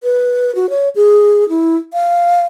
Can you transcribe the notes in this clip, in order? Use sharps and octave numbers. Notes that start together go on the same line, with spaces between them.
B4
F#4
C#5
G#4
E4
F5